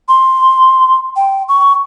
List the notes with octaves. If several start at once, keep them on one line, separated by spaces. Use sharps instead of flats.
C6
G5
C#6